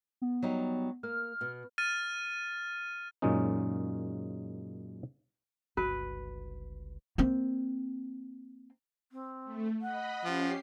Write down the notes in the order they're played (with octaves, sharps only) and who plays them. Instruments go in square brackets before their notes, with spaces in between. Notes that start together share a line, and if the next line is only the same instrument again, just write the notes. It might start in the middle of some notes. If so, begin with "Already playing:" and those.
[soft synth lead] B3
[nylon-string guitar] F#3 G3 D#4
[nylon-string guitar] A#3 [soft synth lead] F6
[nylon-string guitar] B2
[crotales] F6 A6 D#7
[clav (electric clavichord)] F#2 A#2 C#3 G#3 C#4 D#4
[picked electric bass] G1 C#2 G2 [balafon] F#4 [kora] B4
[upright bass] A#3 C4
[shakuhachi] C4
[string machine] A3
[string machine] D#5 B5 [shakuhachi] F#5
[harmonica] F3 [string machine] C#4 G4 C7